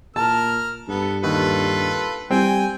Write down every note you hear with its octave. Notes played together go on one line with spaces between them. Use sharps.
A#2 A#4 A5 F6
G2 B3 A4
D#2 F4 A4 B4
G3 C4 G5 G#5